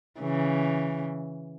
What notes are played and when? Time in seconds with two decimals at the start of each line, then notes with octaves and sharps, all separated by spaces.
0.21 C#3 E3